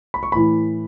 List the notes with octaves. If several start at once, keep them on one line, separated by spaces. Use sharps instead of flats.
B5
C#6
A2 E3 B5